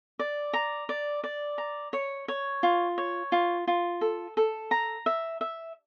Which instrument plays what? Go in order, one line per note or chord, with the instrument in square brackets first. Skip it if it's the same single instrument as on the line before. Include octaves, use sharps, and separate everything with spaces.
[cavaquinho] D5
A#5
D5
D5
A#5
C#5
C#5
F4
C#5
F4
F4
A4
A4
A#5
E5
E5